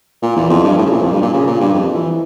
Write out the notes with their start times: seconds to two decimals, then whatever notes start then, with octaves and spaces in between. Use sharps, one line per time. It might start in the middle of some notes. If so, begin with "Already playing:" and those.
0.23 A#2
0.36 E2
0.50 F2
0.64 G2
0.78 A2
0.86 C#3
0.91 A#2
1.02 F2
1.12 G2
1.22 A#2
1.33 C#3
1.47 A#2
1.60 G2
1.74 F2
1.95 E3